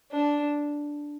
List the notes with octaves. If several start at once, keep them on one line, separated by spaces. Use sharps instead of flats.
D4